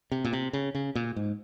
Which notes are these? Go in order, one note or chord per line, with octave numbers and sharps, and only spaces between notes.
C3
A#2
C3
C#3
C#3
A#2
G#2